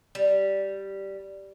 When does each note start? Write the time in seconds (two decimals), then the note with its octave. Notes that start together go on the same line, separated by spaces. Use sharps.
0.15 G3